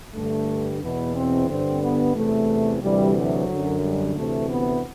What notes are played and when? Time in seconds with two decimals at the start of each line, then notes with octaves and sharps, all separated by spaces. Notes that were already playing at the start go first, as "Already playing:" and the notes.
0.15 G2 D3 A3
0.81 E2 B2 B3
1.15 C4
1.48 G2 D3 C4
1.82 B3
2.15 E2 C3 E3 A3
2.82 D2 C3 E3 G3
3.16 F#3
3.49 F#2 D3
3.82 G3
4.15 D2 C3 E3 A3
4.49 B3